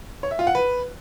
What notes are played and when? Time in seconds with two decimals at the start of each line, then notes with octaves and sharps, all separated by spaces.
0.23 C#5
0.31 E5
0.39 F4
0.47 F#5
0.55 B4